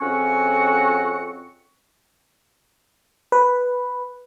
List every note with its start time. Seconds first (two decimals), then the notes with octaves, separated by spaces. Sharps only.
0.01 F2 C#3 C4 C#4 F#4 C#6
3.32 B4